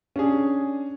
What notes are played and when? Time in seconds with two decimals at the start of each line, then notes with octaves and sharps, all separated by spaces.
0.16 C#4 D4 G#4